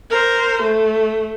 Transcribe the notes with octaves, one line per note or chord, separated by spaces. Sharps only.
A#4 C5
A3